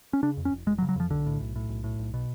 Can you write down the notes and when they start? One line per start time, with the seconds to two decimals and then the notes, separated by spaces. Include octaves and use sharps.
0.13 C#4
0.23 C#3 D4
0.37 F2
0.45 C#4
0.52 F1
0.67 F1 G#3
0.78 F#3
0.82 C#3
0.89 F#3
0.96 F2 F3
1.10 B1 D3
1.26 A2
1.40 B1
1.56 A2
1.69 B1
1.84 A2
1.99 B1
2.14 B2